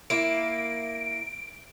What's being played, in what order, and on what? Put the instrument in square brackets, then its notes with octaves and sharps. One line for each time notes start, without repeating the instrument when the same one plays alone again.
[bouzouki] A#3 E4 [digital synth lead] D7